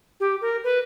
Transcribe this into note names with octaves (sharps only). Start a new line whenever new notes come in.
G4
A#4
B4